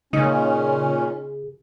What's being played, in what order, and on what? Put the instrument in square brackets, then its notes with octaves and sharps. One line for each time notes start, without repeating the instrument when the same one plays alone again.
[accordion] A#2 C#4 [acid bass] C#3 [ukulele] D#4